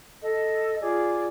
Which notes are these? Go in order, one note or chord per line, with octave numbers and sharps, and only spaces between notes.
A4 D#5
F4 G#4 D5 D6